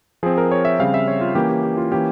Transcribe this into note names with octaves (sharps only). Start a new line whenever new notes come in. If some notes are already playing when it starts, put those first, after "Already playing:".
F3 C4 G#4
A#4
C#5
E5
C#3 G3 C4 F5
E5
C#5
F4
E3 A#3 C#4 G4
G4
G4
F4
E3 A#3 C#4 G4